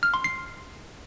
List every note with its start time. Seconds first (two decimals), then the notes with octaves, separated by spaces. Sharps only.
0.03 F6
0.14 C6
0.24 C7